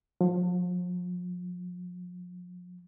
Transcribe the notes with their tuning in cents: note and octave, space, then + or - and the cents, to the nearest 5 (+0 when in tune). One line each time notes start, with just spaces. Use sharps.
F3 +40